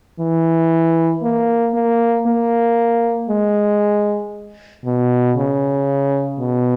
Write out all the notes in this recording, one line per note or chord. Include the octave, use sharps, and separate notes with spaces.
E3
A#3
A#3
A#3
G#3
B2
C#3
B2